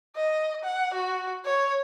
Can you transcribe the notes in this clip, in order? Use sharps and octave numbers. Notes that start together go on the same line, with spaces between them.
D#5
F#5
F#4
C#5